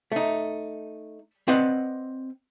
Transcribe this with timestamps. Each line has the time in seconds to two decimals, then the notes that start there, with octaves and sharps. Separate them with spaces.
0.12 A3 D#4
1.48 C4 B4 D5 D#5 F#5